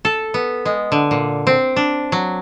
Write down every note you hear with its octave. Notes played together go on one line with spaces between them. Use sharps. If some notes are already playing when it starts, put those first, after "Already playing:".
A4
B3
G#3
D3
A#2
C4
D4
F#3